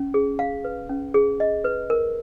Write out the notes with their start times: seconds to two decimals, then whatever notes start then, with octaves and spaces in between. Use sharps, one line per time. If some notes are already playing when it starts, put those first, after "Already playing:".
Already playing: C#4
0.14 G#4
0.39 F5
0.64 B4
0.89 C#4
1.14 G#4
1.40 D#5
1.64 B4
1.90 A#4